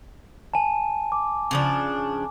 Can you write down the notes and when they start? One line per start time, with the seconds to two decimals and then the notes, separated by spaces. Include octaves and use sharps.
0.54 G#5 A5
1.12 D6
1.51 C#3 F3 D4